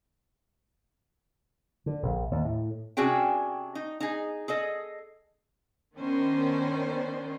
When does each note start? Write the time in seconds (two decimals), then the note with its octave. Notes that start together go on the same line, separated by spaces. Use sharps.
1.86 D3
2.03 A#1
2.31 D#2
2.45 A2
2.97 C3 C#4 D4 F#4 G#4 G5
3.75 D#4
4.00 D#4 G#4
4.48 G#4 A4 D#5
5.96 D#3 B3 C#4 D4 C5